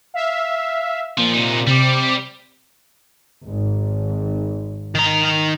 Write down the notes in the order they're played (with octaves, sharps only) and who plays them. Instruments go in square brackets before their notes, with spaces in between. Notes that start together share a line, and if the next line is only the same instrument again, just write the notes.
[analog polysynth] E5 F5
[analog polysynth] A#2 [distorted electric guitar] F3
[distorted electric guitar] C3 D#4
[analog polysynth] C3 D6 [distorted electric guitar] G3
[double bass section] G#1
[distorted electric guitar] D#3 A#5